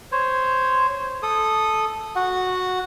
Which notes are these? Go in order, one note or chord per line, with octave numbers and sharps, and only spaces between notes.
C5 C#5
A4 D#6
F#4 F#5